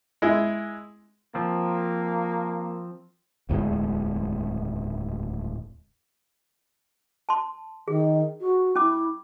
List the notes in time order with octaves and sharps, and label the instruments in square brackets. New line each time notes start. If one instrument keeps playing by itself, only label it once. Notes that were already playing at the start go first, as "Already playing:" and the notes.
[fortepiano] G#3 E4
[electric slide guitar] F3 C4 [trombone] A#3
[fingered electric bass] D1 E2 A2 G#3
[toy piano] A5 C6
[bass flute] D#3 [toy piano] G#4
[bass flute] F#4
[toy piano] C#4 D6 [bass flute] E4